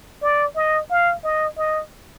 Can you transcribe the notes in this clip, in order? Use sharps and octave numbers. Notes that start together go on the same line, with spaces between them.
D5
D#5
F5
D#5
D#5